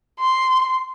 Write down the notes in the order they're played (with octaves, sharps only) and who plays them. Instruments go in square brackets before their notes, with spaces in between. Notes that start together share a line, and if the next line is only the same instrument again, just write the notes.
[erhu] C6